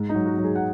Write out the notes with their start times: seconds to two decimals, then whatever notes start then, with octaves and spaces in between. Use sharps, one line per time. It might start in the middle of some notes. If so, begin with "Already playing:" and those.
Already playing: G#2
0.09 D#4
0.14 F#3
0.26 F#4
0.38 F#3
0.44 G#4
0.56 F#5